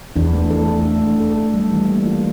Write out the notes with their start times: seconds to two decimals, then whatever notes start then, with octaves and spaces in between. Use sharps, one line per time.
0.16 E2 D4
0.34 A3
0.50 A4
0.68 A3
0.85 D4
1.03 A3
1.20 A4
1.37 A3
1.54 G3
1.72 E3
1.89 A#3
2.06 F4